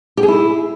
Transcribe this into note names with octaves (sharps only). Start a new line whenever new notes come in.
G4
G#4
E4